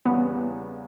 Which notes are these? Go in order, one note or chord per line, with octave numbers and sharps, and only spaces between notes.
E2 C#3 E3 G3 B3